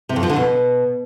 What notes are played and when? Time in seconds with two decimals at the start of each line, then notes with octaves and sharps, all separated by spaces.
0.09 C3
0.16 F2
0.23 F3
0.29 D3
0.36 B2